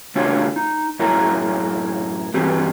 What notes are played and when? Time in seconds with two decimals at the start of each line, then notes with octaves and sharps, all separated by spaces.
0.15 C#3 A3 D4 F4 F#4 C#5
0.56 D#4
0.99 F#2 A2 F#3 E4 A#4 A#5
2.34 G2 E3 C4 F#4 G4